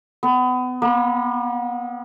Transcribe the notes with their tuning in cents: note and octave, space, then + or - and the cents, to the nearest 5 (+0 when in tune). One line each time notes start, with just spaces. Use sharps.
B3 +30
B3 -45